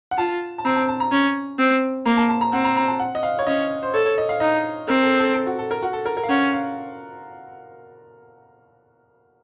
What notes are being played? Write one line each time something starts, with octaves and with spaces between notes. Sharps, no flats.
F#5
F4 A5
A5
C4 A#5
A5
A5
A#5
C#4
C4
A#3 A#5
A5
A5
A#5
C4 F#5
A#5
A#5
A5
F#5
D#5
F5
C#5
C#4 D#5
C5
A4 C#5
C#5
D#5
F5
D#4 D#5
C4 A#4
A4
A4
A4
F#4
A4
A#4
F#4
A4
A#4
A#4
F5
C#4 F#5
F5